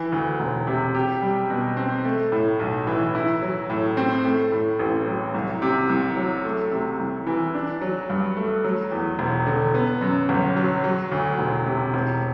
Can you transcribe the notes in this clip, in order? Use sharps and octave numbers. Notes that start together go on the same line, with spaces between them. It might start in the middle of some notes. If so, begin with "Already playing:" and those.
Already playing: E3
D2
E1
C3
G4
G3
B2
C4
A3
A2
B1
E3
E4
F#3
A2
C4
A3
A2
A1
F#3
C2
C3
C2
F#3
A3
C3
C2
E3
D4
F#3
G2
A3
F#3
E2
E1
D3
B3
F#2
G1
F#3
F#3
D2
E1
C3
E1